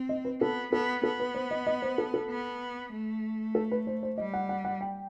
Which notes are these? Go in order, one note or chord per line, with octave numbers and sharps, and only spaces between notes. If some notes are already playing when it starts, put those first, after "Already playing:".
Already playing: C4
D#5
B4
B3 A4
B3 A4
B3 A4
B4
C5
D#5
D#5
C5
A4
A4
B3
A3
A4
B4
C5
C5
G3 D#5
F#5
F#5
F#5
G5